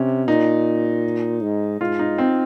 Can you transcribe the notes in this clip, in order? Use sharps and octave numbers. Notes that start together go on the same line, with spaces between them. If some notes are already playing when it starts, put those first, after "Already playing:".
Already playing: C3 C#4
A#2 D#4
G#2
G#2 F4
D#4
C4